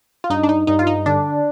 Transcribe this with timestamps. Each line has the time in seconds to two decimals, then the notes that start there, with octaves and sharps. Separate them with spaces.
0.24 F4
0.30 G2 D#4
0.43 D4
0.49 D#4
0.67 G2 D#4
0.79 F4
0.87 D#4
1.06 D3 D4